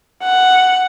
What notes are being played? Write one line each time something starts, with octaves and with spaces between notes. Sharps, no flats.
F#5